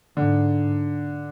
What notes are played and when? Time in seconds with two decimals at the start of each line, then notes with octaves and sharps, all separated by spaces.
0.17 G#2 D3